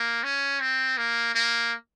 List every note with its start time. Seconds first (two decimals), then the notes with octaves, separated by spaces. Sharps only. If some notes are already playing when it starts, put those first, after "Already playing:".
Already playing: A#3
0.24 C#4
0.60 C4
0.98 A#3
1.35 A#3